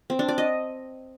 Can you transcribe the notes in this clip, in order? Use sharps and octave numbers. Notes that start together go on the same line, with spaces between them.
C4
D4
D5
D#5